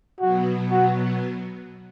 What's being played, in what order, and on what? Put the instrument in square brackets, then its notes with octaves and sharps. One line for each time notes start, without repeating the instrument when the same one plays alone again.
[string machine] B2 F#3 B3 [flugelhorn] F#4
[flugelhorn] F#4